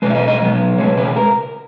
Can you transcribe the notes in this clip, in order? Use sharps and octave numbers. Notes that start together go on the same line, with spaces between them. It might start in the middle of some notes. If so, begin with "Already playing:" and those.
B1 B2 G#3 B4
E5
D#5
D#5
B2 F#3 B3
C#2 B2 G#3 C#5
B4
A#4